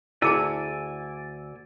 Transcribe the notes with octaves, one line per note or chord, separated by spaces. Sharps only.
D2 E4 G#4 D5 G#5 A5 E6